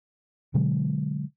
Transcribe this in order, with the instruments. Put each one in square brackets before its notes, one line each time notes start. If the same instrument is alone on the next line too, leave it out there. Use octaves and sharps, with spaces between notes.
[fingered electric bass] B2 D3 F#3 G#3